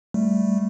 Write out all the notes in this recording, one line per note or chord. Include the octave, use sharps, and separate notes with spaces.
G3 A3